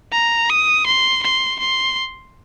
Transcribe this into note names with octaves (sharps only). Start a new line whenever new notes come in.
A#5
D#6
C6
C6
C6